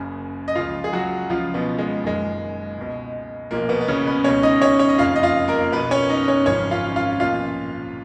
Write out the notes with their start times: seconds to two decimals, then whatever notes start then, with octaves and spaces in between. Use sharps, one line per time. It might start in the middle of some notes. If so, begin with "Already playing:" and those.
Already playing: F#1 F#2 C#3
0.48 D#5
0.55 C#2 C#3 F3 F4 F5
0.84 G#4
0.93 F#3 F#4
1.30 C#2 C#3 F3 F4
1.54 B2 B3
1.78 G#3
2.03 F#1 F#2 D#3 G#3
2.78 C#2 B2
3.51 B1 A#2 F3 A#3
3.69 B2 B3
3.81 B3
3.88 C#3 C#4
4.07 B3 B4
4.24 C#2 B2 C#4 C#5
4.43 D#4 D#5
4.62 C#4 C#5
4.79 C#5
4.89 D#5
4.98 F#1 F2 C#3 F4 F5
5.16 D#5
5.23 F4 F5
5.48 A#3 A#4
5.72 B1 B2 B3 B4
5.91 C#4 C#5
6.10 D#4 D#5
6.28 C#4 C#5
6.46 G#1 F#2 C#3 F3 C#4 C#5
6.71 F4 F5
6.96 F4 F5
7.20 B1 A#2 F3 F4 F5